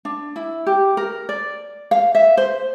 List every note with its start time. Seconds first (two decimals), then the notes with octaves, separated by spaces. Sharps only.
0.05 D4
0.36 E4
0.66 G4
0.97 A#4
1.29 D5
1.91 F5
2.15 E5
2.37 C5